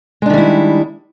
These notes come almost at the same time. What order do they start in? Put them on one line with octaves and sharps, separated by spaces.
G#3 D4 D#3 G3 E4